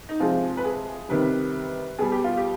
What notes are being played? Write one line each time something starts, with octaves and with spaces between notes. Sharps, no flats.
D#4
C3 F3 G#3 F4
B4
G#4
C3 D#3 G3 B4
B2 G3 G#4
G4
F4
G4